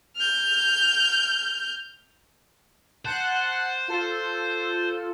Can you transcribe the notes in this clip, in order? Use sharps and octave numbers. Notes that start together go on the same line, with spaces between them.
F6 G6
C5 F#5 A5 F#6
F4 A4